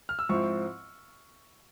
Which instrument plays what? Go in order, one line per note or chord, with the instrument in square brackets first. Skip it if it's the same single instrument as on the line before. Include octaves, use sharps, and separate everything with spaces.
[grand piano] F6
E6
[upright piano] G#2 F3 C4 E4 [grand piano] C#6